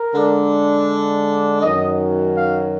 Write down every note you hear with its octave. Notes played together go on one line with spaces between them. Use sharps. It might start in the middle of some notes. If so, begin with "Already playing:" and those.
Already playing: A#4
D3 G#3 D4
F#2 D#3 F#3 D#5
F5